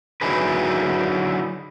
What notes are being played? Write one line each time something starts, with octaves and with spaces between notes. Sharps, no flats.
D3 F#3 D#4 E4 G#4 B4